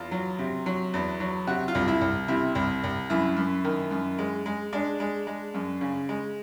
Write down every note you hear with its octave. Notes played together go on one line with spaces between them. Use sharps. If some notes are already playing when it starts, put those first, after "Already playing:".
Already playing: E2 F4
F#3
C3
F#3
E2
F#3
C3 F#4
F4
C2
E4
C2
C3 E4
C2
C2
F#2 E4
F#2
D#3
F#2
G#3
G#3
G#3 D4
G#3
G#3
F#2
C#3
G#3